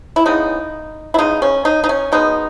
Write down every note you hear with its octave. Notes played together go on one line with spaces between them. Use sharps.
E4
C#3 E3 G#3 B3 D#4
E4
C#3 G#3 B3 D#4
C#4
D#4
D#4
C#4
B2 G#3 B3 D#4